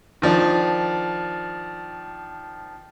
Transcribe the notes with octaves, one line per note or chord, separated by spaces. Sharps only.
D#3 F3 D4